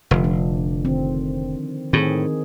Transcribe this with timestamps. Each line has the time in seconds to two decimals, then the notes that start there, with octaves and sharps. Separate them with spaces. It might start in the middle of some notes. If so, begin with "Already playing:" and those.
0.11 F1 D3 F3
0.24 D4
0.85 D#3 C4
1.93 A2 D#3 C4 G#4